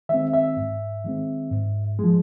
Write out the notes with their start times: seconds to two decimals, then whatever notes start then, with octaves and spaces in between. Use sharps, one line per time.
0.09 D#3 G#3 C4 E5
0.33 E5
0.57 G#2
1.04 D#3 G#3 C4
1.51 G#2
1.99 F3 G#3